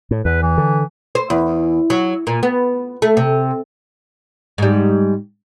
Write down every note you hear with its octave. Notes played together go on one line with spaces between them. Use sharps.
A2
E2 B4
E3
D3
C5
E2
F#3
A#2
B3
A3
C3
G#2 G3